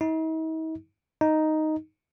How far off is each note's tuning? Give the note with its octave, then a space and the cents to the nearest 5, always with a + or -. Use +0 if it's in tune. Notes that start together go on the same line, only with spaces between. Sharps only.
D#4 +45
D#4 +0